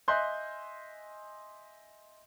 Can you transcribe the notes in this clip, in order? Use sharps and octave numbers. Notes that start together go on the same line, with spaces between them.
D#5 E5 G#5 C6 F#6 G6